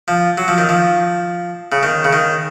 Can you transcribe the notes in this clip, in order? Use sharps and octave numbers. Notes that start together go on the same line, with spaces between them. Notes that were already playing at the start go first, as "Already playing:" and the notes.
F3
F#3
F3
D#3
F3
C#3
D#3
C#3
D#3